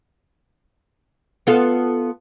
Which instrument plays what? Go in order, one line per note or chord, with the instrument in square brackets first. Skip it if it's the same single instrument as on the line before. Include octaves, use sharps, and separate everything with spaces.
[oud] B3 F4 A4